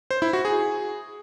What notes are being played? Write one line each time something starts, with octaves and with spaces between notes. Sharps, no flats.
C5
E4
F#4
G#4